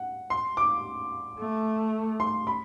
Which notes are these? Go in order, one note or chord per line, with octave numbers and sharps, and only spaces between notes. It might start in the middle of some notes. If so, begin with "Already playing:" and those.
Already playing: F#5
C6
D6
A3
C6
B5